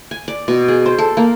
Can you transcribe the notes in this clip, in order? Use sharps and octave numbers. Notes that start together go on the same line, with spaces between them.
G#5
D5
B2
G#4
C5
A4
A#3